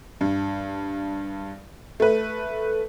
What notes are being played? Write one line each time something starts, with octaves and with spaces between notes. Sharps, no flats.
G2
A3 B4